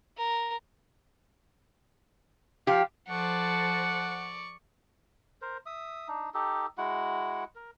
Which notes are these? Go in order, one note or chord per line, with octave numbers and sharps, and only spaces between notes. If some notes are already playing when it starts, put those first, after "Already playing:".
A#4
F3 G4 F5
F3 A4 C5 D5 F#5 C#6
A#4 C5
E5 D#6
D4 D#4
D#4 G4 A4
G#3 E4 F#4 F#5
A#4